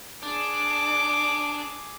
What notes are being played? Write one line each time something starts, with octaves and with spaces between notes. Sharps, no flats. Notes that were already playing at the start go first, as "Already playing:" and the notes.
D4 G#4 D6